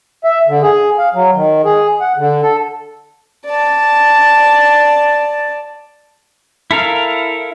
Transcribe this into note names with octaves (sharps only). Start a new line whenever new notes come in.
E5
D3
G#4
F5
F#3
D#3
G#4
F#5
D3
A4
D5 A5
E4 A4 A#4 F5